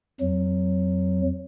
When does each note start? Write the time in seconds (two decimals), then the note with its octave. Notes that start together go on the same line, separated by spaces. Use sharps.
0.21 F2 F#3